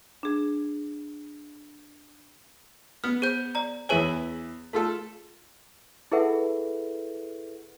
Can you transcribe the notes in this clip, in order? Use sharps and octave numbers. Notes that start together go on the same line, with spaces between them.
D4 G#4
B3 F6
G#4 C5 G6
D5 A#5
E2 E4 G#4 B4 C#5 G#5
A3 F4 A4
E4 G#4 A4 B4 E5 F#5